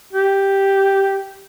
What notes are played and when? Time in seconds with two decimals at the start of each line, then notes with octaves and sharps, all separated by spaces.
0.13 G4